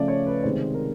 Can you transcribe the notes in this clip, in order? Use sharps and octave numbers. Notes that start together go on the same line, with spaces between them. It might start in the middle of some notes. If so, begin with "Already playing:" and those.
Already playing: C#3 F3 A3 C#4 D5
C#5
B4
C3 D#3 G#3 C5
A#4